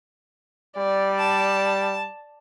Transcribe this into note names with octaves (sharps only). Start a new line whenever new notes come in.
G3 D5
A5